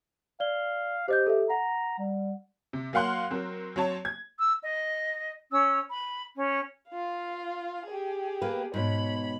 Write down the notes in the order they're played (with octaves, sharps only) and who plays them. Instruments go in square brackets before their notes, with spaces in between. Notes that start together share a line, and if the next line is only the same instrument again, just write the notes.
[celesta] D5 G7 [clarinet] F5
[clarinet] G4 [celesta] C5 D#5 G6
[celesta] A4 E5
[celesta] F#5 [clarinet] A#5
[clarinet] G3
[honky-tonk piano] C3
F#3 A#3 F5 F#5 C6 F#6
F#3 C4 A#4
F#3 C4 C#5 A5
G#6
[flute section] E6
D#5
C#4 E6
B5
C#4
[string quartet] F4 F5
G4 G#4
[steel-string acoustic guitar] A#3 B4
[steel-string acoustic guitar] G#2 B2 [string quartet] C#5 B5